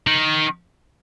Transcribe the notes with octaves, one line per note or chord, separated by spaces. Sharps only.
D#3